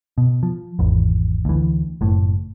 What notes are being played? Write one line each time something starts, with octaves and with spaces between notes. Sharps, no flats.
B2
F3
G#1 E2
D2 E3
F#1 A2